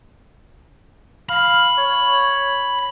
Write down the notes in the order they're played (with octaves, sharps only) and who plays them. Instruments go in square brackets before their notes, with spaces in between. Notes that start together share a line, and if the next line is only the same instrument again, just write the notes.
[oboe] F5 [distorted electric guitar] B5
[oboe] C#5